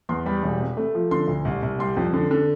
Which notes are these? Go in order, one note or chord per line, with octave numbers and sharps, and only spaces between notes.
E2 C6
G3 B5
E1
C3
A3
F3
D3 C6
D2
C2
C2
G3 C6
F2
D3
D3